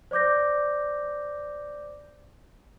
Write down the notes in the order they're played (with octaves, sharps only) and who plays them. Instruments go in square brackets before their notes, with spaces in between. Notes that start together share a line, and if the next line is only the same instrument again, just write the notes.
[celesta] C5 D5 D6 G6 A#6